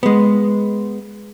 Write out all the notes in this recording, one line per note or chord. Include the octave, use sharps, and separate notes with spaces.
G#3 B3